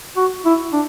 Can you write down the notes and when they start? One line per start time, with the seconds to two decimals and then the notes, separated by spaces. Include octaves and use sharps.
0.16 F#4
0.45 E4
0.73 D4